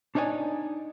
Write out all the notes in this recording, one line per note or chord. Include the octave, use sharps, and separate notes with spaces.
D4 D#4 C#5 D5 G#5